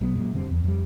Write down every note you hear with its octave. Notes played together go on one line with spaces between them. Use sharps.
B1 F#3 B3
F#2 A#2 G#3
F1 D3 G3 C4
D#1 E2
F2 G3